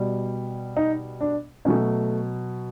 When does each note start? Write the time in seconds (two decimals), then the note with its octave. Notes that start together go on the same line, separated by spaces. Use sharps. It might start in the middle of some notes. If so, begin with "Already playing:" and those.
Already playing: B2 G3
0.77 D#4
1.21 D4
1.65 B2 F#3 A3 C#4